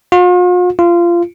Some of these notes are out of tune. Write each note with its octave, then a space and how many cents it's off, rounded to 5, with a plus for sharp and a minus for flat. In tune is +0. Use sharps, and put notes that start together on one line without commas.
F4 +45
F4 -20